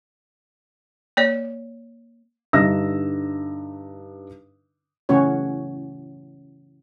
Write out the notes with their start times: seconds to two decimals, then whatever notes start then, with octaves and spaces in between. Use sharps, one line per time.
1.17 A#3 C#5 D5
2.53 G2 D3 D#4 E5 E6 A#6
5.09 C#3 E3 A3 C#4 F#4 C#5